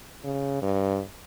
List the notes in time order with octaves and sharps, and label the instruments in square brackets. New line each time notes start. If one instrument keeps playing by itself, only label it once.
[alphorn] C#3
G2